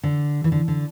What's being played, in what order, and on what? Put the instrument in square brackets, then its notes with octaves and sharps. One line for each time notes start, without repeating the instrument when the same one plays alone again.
[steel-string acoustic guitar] D3
E3
D3
D3